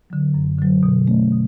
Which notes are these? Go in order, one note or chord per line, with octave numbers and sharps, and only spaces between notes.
D3 F#3
F#2
D3 F#3
B2
A3 C#4
B2